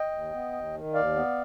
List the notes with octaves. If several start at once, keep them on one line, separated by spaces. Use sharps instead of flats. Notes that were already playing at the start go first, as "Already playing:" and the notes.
Already playing: D#5 G5
D#2
B3
D#2
D#3
D#2 D5 F5
B3